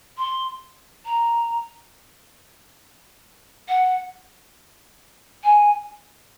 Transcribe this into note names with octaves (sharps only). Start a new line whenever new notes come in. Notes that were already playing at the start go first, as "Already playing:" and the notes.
C6
A#5
F#5
G#5